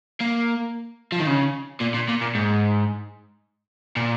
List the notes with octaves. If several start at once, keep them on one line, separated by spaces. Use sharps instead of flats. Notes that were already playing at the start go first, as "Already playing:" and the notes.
A#3
F3
D#3
C#3
A#2
A#2
A#2
A#2
G#2
A#2